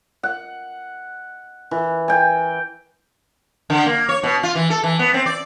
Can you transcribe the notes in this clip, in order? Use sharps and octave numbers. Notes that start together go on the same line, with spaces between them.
F#5
E3
G5 G#5
D3
A#3
C#5
B2
F4
E3
A4
E3
B3
C4
D5